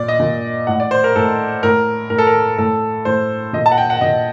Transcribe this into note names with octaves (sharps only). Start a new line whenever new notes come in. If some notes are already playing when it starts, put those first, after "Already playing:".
Already playing: A#2 D5
D#5
A#2
A2 F#5
D5
C5
A#4
A2 A4
A2 A#4
A2 A#4
A4
A#4
A2 A4
A2 C5
A#2 D#5
A5
F#5
G5
F#5
A#2 D#5